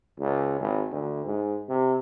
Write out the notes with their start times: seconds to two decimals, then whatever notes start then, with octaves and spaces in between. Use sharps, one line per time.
0.20 C#2
0.60 G#1
0.91 D2
1.26 G#2
1.69 C3